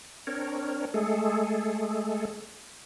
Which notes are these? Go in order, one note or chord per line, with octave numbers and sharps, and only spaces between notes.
C4 D4 A#4 C#5
G#3 A3 G#4 A4